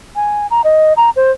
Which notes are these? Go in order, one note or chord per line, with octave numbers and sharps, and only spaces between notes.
G#5
A#5
D#5
A#5
C5